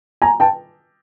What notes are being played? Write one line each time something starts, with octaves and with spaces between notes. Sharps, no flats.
G#5 A#5
G5 A5